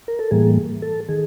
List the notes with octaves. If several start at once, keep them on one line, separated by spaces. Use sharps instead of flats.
A#4
A4
A2 E3 G3 A#3 G#4
A4
D#3 G#4